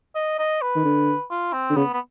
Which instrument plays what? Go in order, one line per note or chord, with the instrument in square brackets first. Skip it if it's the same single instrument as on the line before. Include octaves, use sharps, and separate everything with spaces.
[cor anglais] D#5
D#5
B4
[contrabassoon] D#3
D3
[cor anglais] F4
C4
[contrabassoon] D3
[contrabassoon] C#3 [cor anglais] B3
[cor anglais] B3